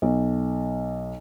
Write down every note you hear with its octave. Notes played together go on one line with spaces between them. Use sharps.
B1